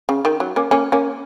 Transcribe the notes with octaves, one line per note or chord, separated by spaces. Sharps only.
C#3
D#3
F#3
A#3 C#4
A#3 C#4
A#3 C#4